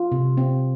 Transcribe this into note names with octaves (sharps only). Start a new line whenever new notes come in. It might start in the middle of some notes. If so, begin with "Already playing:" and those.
Already playing: F4
C3
C4